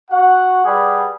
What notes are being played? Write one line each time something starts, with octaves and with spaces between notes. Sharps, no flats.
F#4 F#5
G3 G#4 B4 D5 F#5 B5